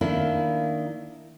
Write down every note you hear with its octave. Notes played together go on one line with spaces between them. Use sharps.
D#3 A#3 D4 E4